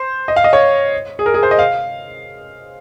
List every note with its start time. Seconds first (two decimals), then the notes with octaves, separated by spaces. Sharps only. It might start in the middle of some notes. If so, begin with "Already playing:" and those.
Already playing: C5
0.28 D#5
0.36 F5
0.44 D#5
0.53 C#5
1.19 G#4
1.26 A#4
1.34 G#4
1.43 C5
1.51 D#5
1.59 F5